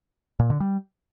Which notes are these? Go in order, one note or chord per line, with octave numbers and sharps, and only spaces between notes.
A#2
D3
G3